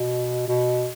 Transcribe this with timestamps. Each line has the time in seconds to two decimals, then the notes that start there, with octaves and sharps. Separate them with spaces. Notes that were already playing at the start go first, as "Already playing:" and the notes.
Already playing: B2
0.48 B2